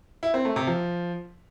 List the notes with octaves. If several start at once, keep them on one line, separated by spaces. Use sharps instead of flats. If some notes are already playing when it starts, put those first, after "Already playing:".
E4
C4
A3
C3
F3